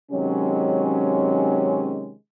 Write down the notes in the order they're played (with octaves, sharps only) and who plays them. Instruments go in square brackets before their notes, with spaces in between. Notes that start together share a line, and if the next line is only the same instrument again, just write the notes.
[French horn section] C3 D#3 F#3 G#3 C#4